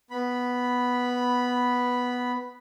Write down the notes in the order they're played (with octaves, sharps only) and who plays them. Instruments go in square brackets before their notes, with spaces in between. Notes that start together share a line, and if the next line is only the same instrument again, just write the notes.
[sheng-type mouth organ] B3 B5